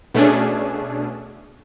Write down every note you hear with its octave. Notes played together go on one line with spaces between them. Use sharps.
B2 A3 C#4 D4 G#4